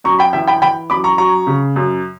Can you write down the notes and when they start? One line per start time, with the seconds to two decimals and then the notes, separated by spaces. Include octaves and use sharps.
0.04 F#2 A#5 C#6
0.19 G5 B5
0.33 E3 E5 G5
0.47 G5 B5
0.62 E3 G5 B5
0.90 F#2 B5 D6
1.04 A#5 C#6
1.18 F#3 A#5 C#6
1.47 C#3
1.76 F#2